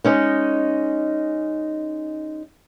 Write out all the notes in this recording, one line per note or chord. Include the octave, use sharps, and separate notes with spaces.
G#3 C#4 D#4